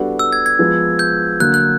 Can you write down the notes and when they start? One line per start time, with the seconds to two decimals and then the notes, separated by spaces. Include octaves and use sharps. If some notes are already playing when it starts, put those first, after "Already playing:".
Already playing: G3 B3 D4 F#4 A4
0.19 E6
0.33 G#6
0.46 G#6
0.59 F3 G#3 B3
0.99 G6
1.40 D3 F#3 A#3 F#6
1.54 F#6